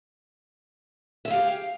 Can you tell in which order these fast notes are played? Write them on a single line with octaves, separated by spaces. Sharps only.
E5 G#4 F5 G4